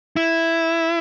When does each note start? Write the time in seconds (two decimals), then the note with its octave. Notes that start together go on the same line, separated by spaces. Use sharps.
0.16 E4